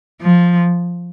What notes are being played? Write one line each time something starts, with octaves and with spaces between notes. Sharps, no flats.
F3